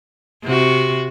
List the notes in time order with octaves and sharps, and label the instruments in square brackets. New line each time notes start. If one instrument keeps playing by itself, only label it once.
[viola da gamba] C3 F#4